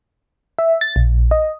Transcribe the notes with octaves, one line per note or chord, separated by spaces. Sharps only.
E5
A6
A#1
D#5